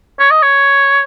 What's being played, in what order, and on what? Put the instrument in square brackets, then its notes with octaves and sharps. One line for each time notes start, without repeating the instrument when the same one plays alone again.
[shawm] C#5
D#5
C#5